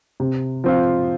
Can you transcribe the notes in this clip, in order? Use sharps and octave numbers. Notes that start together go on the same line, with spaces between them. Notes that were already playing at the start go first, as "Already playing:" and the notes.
C3
F3 C4 F4